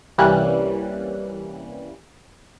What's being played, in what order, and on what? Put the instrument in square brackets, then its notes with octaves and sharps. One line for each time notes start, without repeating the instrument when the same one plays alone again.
[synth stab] C2 E3 G3 A#3 C#4 F#6